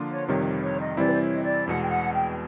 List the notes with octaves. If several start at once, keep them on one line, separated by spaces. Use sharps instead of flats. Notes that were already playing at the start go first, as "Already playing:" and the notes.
Already playing: D3 F3 A#3 D4 F4
C#5
F2 C3 D#3 G3 C#5
C#5
C#5
D#5
C3 E3 G3 C4 E4 D5
B4
C5
C#5
D#5
D5
E2 B2 G#3 F#5
G5
F#5
G5